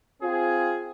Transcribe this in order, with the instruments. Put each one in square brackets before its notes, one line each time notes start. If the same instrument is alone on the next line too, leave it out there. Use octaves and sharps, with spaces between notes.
[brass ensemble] C4 F4 G#4